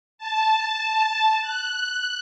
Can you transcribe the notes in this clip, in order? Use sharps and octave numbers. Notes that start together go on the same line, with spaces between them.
A5
F#6